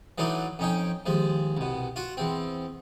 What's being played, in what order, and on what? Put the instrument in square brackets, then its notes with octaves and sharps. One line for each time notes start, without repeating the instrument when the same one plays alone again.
[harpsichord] E3 F#3 A3 D4 D#4
F2 C#4 D#4 G5
D#2 F3 G#3
C2 B2
F4 F#4
E2 C4